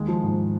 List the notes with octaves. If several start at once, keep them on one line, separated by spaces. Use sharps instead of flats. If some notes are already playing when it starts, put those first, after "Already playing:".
Already playing: D#2 G#3
F3
G#2